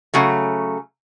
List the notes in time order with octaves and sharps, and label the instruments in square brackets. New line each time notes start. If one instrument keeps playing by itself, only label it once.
[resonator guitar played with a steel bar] C#3 F#3 A3